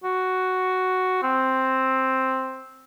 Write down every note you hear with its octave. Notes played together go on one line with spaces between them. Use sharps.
F#4
C4